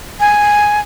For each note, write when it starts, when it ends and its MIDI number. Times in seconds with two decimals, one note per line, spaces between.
0.20 0.80 80